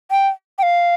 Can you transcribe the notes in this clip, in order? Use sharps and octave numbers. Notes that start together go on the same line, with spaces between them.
G5
G5
F5